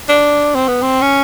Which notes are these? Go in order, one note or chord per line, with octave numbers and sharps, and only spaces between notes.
D4
C4
B3
C4
C#4